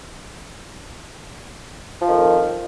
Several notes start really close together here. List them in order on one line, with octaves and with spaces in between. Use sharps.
F3 D#3 F2